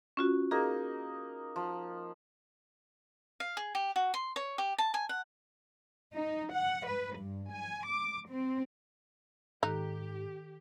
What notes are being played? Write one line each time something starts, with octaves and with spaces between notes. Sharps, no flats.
C#4 F4 F#4
A#3 D#4 G#4
F3
F5
G#4
G4
F#4
C6
C#5
G4
A5
G#5
F#5
D#4
F#5
B4
G2
G#5
D6
C4
G#2 D#3 D#4 G4 A4 F#6